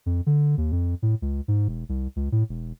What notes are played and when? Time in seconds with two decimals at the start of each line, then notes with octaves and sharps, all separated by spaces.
0.06 F2
0.26 D3
0.58 D#2
0.72 F2
1.02 A2
1.22 C#2
1.48 G#2
1.68 E1
1.89 C2
2.16 C#2
2.32 A2
2.49 E1